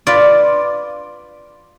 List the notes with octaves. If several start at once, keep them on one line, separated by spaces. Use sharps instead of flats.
F4 B4 D5